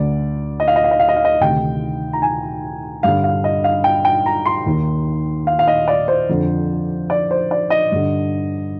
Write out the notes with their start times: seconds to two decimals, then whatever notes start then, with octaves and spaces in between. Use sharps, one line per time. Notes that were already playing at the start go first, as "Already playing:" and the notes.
Already playing: D2 D3 D5
0.60 D#5
0.68 F5
0.76 D#5
0.84 F5
0.91 D#5
1.00 F5
1.09 D#5
1.16 F5
1.25 D#5
1.41 D2 C3 D#3 G5
2.13 A#5
2.22 G#5
3.03 G2 D3 F5
3.24 F5
3.44 D#5
3.64 F5
3.84 G5
4.05 G5
4.26 A#5
4.46 C6
4.66 D#2 D#3
5.47 F5
5.59 F5
5.67 D#5
5.88 D5
6.08 C5
6.29 F2 D3
7.10 D5
7.31 C5
7.51 D5
7.70 D#5
7.92 G2 D3